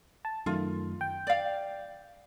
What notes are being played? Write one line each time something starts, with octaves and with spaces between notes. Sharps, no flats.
A5
F#2 D#3 A3 F4
G5
D5 F5